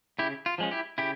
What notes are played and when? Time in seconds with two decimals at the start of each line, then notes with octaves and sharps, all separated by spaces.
0.19 C#3 E4 G4
0.46 F4
0.58 F3 G#3 C#4
0.71 E4 G4
0.98 C#3 E4 G4